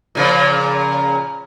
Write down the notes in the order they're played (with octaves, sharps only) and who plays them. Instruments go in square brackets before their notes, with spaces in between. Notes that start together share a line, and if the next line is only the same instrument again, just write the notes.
[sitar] A#2 C#3 F3